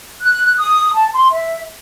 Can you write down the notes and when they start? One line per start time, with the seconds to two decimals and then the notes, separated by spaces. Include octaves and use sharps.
0.21 F#6
0.57 D#6
0.94 A5
1.14 C6
1.32 E5